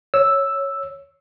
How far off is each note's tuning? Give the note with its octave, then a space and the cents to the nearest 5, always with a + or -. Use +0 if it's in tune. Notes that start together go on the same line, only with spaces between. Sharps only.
C#5 +0 E6 +0